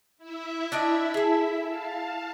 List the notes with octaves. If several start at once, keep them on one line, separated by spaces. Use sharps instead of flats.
E4 E5
D4 D#4 D5
G#4 A4
F5 A5